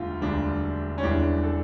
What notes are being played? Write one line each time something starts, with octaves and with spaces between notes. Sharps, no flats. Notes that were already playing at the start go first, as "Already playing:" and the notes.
Already playing: E1 D2 D3 G3 F4
E1 D2 D3 G3 D4
C#4
E1 E2 E3 G3 D4
A4